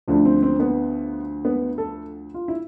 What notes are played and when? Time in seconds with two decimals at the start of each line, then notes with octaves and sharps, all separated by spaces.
0.08 D2 D3 F3 D4
0.25 C4
0.43 C4
0.60 B3
1.45 B3
1.78 A4
2.34 F4
2.48 E4